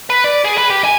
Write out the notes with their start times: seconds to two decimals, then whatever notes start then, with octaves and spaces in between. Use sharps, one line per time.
0.10 B4
0.24 D5
0.44 G#4
0.58 B4
0.70 G4
0.84 G#5